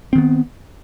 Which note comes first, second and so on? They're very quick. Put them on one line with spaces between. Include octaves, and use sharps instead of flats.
C4 D#3 B3